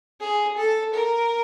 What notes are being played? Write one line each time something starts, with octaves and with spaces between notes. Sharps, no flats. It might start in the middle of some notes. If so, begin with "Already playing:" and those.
G#4
A4
A#4